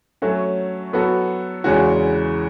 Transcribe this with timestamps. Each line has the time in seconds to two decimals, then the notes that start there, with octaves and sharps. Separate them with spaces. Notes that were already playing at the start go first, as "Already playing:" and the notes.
0.22 F#3 A3 C#4 F#4
0.93 F#3 B3 F#4 A4
1.64 E2 C#3 G#3 C#4 F#4